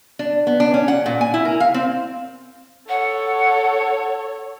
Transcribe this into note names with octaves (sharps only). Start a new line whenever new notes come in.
D4
B3
D4
C#4
F#5
A#2
G#5
E4
A#4
F5
C4
A4 C#5 F#5